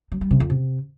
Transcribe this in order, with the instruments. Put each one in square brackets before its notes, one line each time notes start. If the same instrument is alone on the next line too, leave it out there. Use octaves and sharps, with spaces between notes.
[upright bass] F#3
G3
C3
F2
C3